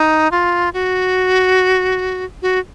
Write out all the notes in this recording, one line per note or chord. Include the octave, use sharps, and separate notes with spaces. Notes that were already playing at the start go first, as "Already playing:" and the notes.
Already playing: D#4
F4
F#4
F#4